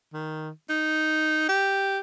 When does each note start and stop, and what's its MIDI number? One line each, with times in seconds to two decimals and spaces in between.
0.13 0.49 51
0.69 1.46 63
1.49 1.99 67